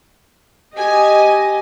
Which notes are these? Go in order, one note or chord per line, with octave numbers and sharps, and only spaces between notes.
G4 D#5 G#5